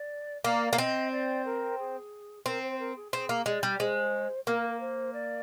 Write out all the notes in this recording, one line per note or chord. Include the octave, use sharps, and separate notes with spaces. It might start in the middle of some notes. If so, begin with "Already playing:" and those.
Already playing: D5
A#3 D5
A#3
C4 D#5
D5
A#4
G#4
C4 A#4
C5
A#4
G#4
C4 G#4
A#3
G#3 D5
G3
G#3 C5
A#3 A#4
A#4
C5
D5